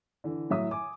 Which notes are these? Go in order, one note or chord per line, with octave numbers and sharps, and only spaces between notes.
D3 E3
A2 F#3 E5 D#6
G#5 D6